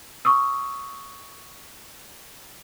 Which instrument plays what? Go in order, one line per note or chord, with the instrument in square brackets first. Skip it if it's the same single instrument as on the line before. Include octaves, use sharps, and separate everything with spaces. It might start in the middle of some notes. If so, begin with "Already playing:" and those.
[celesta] C#6 D#6 E6